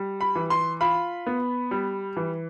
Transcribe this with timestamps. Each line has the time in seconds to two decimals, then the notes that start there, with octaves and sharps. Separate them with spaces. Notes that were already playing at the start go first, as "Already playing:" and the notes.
Already playing: G3
0.21 B5
0.35 E3
0.50 C6
0.80 F4 B5
1.27 B3
1.71 G3
2.17 E3